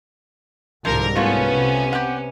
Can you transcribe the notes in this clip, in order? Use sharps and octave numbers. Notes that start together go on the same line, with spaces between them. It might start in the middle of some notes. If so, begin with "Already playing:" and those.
C2 G#2 D3 F3 A#4
A3 B3 C#4 F4 C#5
C3
G4 F#5